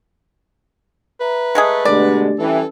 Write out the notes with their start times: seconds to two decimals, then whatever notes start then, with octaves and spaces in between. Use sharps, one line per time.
1.21 B4 E5 A#5
1.55 G#3 A3 G#4
1.85 B2 D3 G#3 A3 D4 G4 D5
2.39 E3 G3 C#4 A4